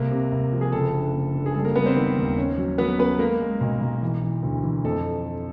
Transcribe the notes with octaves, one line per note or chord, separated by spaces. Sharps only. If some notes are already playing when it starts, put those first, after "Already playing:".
Already playing: C2 A#3 A#4
C3
C2
F3
G#4
F#1 A4
D3
F#1
D3
G#4
G3 A4
A#3 A#4
G3 B3 B4
C4 C5
D#3
D#2
C#4
F#3
F#3 B3 B4
B3 C#4 B4
G#3 A#3 A#4
G#3
B1
B1
E3
E3
D2
E3
F2 A4